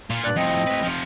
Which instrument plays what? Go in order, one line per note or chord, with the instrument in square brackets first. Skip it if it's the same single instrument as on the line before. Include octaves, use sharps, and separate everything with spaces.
[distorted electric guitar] A#2 F4
[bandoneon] G2 D5 F#6
[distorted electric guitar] F2 A2 [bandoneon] C4 D#5
[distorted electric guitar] A2 B4
C3 F3